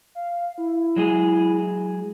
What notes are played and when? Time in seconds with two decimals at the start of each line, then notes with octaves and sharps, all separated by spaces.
0.15 F5
0.58 E4
0.96 F#3 G#3 G#4